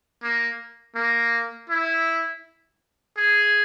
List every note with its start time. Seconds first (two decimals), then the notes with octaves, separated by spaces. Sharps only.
0.23 A#3
0.96 A#3
1.70 E4
3.17 G#4